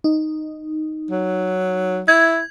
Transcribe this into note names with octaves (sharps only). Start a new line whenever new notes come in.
D#4
F#3
E4 G#6